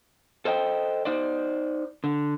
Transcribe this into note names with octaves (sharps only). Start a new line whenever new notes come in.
A4 C5 D#5 G5
D#4 C5 D5
D3